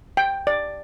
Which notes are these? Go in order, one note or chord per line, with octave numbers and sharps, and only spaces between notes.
G5
D5